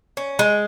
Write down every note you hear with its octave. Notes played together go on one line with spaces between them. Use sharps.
C#4
G#3